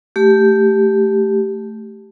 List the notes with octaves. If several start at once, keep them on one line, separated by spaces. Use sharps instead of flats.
A3 G4